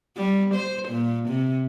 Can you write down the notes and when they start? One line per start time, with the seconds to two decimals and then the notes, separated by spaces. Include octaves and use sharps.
0.17 G3
0.54 C5
0.88 A#2
1.28 C3